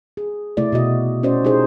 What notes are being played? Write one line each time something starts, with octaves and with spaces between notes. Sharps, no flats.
G#4
C3 A3 E4 D5
B2 F#4 D#5
C#4 F#4 C5 D5 D#5
D#4 E4 G4 G#4 C5